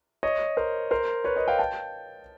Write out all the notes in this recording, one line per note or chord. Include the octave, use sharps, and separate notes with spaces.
C#5 D#5
A#4 C5
A#4 C5
B4 C#5
C#5 D#5
F5 G5
G5 A5